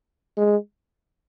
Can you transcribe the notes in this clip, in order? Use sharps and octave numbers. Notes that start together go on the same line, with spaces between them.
G#3